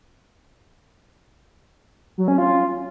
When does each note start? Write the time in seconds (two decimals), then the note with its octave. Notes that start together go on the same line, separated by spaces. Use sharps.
2.18 F#3
2.28 C#4
2.38 F4